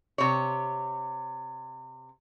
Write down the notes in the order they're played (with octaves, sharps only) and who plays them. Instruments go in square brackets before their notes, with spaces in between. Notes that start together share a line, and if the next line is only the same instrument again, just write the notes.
[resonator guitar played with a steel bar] C3 C#5